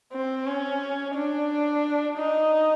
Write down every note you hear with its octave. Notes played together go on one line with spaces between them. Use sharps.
C4
C#4
D4
D#4